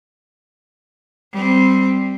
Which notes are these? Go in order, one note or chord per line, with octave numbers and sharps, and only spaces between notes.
G3 C4